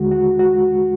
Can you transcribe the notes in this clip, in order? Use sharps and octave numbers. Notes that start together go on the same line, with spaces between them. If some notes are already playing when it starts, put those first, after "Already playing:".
Already playing: D#2 D3 G#3 F#4
F#4
F#4